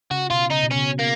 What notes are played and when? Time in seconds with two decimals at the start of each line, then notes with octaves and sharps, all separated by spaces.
0.11 C#3 F#4
0.30 B2 F4
0.51 C#3 D#4
0.63 B2
0.72 C#3 C#4
0.99 A#3